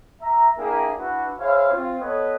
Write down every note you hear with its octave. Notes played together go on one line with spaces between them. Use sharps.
E5 A#5
A#3 D4 E4 G4 G#4 A#4
D4 E4 F#4 B4
E4 G#4 C5 C#5 F5
C4 F4
B3 A4 B4 C#5 D#5